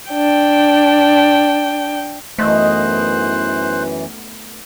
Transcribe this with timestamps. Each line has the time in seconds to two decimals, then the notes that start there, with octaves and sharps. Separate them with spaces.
0.11 D4 G5
2.39 F#2 B2 E3 A3 D#4 C5 D#5 F#6